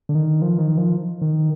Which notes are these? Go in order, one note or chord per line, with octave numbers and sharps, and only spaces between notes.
D3
D#3
F3
D#3
F3
D#3